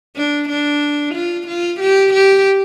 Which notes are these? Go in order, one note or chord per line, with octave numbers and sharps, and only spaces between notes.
D4
D4
F4
F4
G4
G4